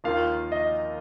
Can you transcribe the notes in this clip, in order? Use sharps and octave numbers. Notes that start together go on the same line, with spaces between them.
D#2 D#3 A#3 F4 F5
D#5